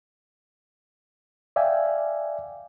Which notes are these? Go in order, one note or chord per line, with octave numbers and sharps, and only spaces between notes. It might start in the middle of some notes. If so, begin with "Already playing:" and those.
D5 E5 F5 G5 G#5